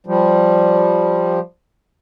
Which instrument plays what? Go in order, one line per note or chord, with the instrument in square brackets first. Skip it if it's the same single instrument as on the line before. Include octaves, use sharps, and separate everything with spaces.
[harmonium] F3 G3